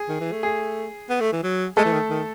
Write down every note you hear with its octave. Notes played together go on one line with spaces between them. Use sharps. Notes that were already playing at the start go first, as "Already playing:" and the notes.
Already playing: G#4
D#3
E3
A3
G#4
B3
A3
E3
F#3
G#3 A3 A4
E3
D#3
D#3